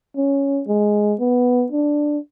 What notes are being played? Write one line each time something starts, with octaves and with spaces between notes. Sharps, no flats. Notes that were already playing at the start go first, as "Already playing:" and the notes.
C#4
G#3
B3
D4